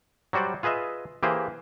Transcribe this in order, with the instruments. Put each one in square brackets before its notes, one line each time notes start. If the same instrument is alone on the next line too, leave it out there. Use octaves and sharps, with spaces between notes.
[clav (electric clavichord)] F#3 G3 F#4 C5 D5
F4 G#4 B4 D#5 E5
E3 A#3 G4 G#4 C5